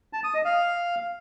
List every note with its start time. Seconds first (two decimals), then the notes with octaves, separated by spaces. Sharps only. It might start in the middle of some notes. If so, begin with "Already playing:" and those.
0.13 A5
0.24 D#6
0.34 D#5
0.45 F5